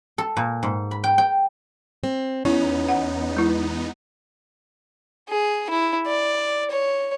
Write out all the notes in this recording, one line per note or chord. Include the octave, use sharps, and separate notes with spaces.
A4
A#2
G#2
B5
G5
G5
C4
E2 B3 C#4 D#4 E4
F#5
G#3 E4
G#4
E4
D5
C#5